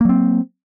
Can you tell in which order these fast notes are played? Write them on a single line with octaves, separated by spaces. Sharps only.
A#3 F#3 C4